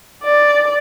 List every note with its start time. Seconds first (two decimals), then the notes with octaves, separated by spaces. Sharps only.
0.23 D5